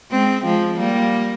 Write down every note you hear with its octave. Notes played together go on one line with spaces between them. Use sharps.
G#3 C4
F3 G#3
G3 A#3